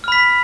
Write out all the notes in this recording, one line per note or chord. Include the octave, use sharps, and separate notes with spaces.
B5 F6 B6